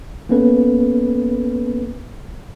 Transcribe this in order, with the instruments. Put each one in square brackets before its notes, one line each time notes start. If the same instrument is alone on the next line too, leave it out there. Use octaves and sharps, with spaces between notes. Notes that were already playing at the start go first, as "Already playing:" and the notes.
[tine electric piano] A#3 B3 C#4 A4 B4